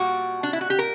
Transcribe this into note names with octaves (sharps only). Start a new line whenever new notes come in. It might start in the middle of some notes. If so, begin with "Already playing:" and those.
Already playing: A#2 G3 F#4
D4
E4
F#4
G4
A#4